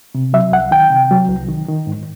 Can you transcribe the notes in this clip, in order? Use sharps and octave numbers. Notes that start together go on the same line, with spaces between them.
C3
F#3 E5
C2 F#5
D#3 G5
C3
F#3
C2
D#3
D#3
G#2